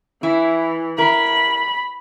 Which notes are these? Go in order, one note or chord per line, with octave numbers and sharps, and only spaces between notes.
E3 E4
E4 A#4 B5